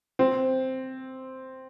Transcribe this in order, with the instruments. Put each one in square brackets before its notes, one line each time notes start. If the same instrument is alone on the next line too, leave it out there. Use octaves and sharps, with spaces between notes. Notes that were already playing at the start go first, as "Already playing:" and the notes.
[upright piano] C4